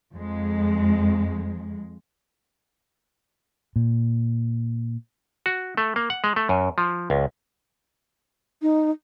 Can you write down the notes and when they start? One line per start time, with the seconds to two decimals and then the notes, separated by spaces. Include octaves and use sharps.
0.14 F2 G#3
3.76 A#2
5.46 F#4
5.77 A3
5.96 A#3
6.10 F#5
6.24 G#3
6.36 A3
6.49 F#2
6.78 F3
7.10 C#2
8.62 D#4